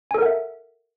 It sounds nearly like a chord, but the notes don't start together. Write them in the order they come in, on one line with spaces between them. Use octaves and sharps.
G#5 A4 A#4 F#5 E5